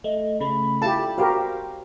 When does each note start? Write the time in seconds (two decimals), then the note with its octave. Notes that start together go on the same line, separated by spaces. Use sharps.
0.04 A3 D#5
0.40 C#3 A3 B5
0.82 E4 F4 G4 A4 A5
1.18 F#4 G4 A#4 C5 F5 G5